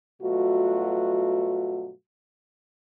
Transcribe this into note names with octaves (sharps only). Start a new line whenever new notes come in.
G2 B2 F#3 A3 F4 F#4